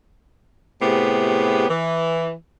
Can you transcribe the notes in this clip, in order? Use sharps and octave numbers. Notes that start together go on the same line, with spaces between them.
A2 C3 B3 G4 G#4
E3